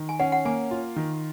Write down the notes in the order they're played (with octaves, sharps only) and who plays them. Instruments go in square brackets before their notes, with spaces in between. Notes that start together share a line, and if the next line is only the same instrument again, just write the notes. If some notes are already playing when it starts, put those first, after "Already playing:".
Already playing: [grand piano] D#3
[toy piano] G#5
[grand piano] C#4 [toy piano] F#5
[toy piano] F#5
[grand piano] A#3 [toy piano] G#5
[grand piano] F4
D#3